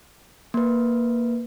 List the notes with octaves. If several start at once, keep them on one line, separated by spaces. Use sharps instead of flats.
A#3 B4